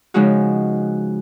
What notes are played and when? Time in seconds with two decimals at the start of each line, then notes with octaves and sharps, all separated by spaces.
0.14 C#3 F3 G#3 D#4 F#4